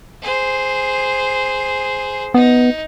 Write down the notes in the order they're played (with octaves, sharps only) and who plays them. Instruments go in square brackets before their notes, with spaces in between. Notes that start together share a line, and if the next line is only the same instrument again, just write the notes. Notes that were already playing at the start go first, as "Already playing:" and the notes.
[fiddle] G#4 C5
[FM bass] B3 [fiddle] D#4